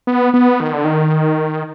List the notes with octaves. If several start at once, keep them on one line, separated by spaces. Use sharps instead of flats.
B3
B3
D#3
D3
D#3